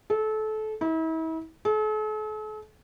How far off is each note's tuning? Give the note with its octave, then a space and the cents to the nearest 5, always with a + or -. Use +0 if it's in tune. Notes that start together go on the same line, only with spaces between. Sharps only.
A4 -25
E4 -40
A4 -45